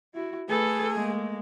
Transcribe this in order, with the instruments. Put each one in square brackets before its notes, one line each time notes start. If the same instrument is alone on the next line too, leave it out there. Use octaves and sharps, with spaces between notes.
[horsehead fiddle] E4 F#4
[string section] A3 [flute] G#4 [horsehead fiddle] A4 B4
[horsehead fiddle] G#3 A#3